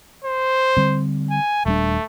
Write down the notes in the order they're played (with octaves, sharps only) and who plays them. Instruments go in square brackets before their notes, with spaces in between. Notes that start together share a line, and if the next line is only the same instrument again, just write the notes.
[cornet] C5
[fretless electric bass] D3 G3 C4
[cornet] G#5
[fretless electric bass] D#1 G3 D4 [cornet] A3